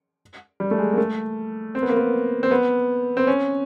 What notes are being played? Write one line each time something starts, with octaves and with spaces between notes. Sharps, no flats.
G3
A3
G#3
A#3
A3
C4
B3
A#3
B3
C4
B3
C4
C#4